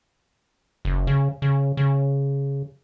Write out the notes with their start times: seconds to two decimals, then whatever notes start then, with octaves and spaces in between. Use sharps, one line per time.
0.85 F#1
1.07 C#3
1.42 C#3
1.77 C#3